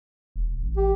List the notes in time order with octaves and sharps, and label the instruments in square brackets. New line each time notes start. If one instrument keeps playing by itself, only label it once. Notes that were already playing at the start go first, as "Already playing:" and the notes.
[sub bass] E1
A1
[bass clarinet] G4